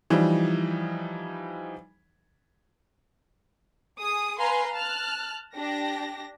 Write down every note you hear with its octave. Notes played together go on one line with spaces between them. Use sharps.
E3 F3 G3 D#4
G#4 D#6
B4 F5 G#5 A#5 C6
A5 F6 F#6
D4 G4 A#6